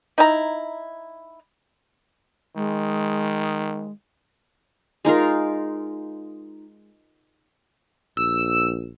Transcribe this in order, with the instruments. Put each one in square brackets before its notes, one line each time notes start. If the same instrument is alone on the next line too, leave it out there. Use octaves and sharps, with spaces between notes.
[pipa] D#4 E4 A#5
[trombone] D#3 [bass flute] G#3
[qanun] G#3 D#4 F4 A#4
[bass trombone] A#1 [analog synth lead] E6